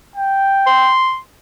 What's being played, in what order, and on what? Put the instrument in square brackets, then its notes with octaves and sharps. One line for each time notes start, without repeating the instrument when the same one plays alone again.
[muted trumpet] G5
[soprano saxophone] C6